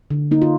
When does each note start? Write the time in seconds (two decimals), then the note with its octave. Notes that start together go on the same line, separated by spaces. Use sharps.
0.11 D3
0.31 A#3 D#4
0.42 F4